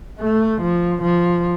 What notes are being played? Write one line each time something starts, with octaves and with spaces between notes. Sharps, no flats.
A3
F3
F3